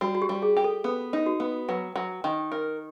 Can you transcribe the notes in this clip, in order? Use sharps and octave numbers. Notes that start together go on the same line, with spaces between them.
G3 F#4
F#4
G4
G3
G4
G#4
G4
A4
B3 A4
D#4
F#4
B3
F#3 B4
F#3
D#3
A#4